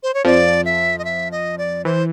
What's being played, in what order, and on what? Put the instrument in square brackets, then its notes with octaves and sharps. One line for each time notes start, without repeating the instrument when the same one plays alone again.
[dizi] C5
C#5
[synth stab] F2 F3 [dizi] D5
[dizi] E5
D#5
E5
D#5
D5
[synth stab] E3 [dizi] C5